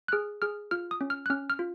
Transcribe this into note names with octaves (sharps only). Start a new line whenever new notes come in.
F#6
G#4 F6
G#4 F6
F4 F6
D#6
C#4
F6
F#6
C#4 F6
F6
F4